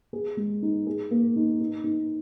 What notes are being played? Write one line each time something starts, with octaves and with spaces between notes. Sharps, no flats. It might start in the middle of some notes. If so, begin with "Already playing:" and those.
G#4
G#3
D#4
G#4
A#3
D#4
D#4
D#4